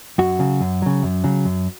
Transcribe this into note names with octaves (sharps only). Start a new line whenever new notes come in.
F#2 F#4
C#3 F#3
F#2
C#3 F#3
F#2
C#3 F#3
F#2